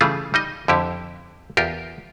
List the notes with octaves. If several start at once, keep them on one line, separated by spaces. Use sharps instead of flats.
C#3 E3 G3 A3 F4 G#4
G3 D#4 D#5
F2 D3 E4 G4
E2 F4 G4 A#4